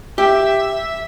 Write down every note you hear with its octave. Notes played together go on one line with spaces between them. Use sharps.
G4 E5